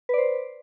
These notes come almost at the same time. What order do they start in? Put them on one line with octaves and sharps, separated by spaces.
B4 D5 C5